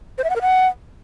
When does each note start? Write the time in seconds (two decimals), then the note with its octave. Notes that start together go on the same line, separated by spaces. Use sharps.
0.18 C5
0.24 E5
0.30 F#5
0.36 A#4
0.42 F#5